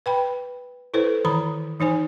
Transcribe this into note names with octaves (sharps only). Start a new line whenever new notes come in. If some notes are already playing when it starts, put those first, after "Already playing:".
B4 G5 B5
E4 A4 B4 C5
D#3 E3 A#5 B5
E3 D#4 C5 G#5